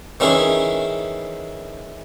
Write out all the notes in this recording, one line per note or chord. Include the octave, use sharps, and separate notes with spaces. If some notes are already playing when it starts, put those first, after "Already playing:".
D#3 E3 C#4 E4 G#4